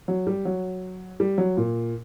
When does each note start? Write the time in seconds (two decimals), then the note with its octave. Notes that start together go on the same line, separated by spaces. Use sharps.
0.08 F#3
0.27 G3
0.45 F#3
1.20 G3
1.38 F#3
1.57 A#2